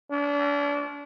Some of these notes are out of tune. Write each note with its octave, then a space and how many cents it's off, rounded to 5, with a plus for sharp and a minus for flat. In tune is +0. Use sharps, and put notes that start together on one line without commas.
D4 -35